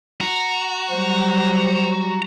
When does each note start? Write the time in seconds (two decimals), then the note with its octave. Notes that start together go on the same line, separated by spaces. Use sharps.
0.21 F#4 A#5
0.91 F#3 G3 C5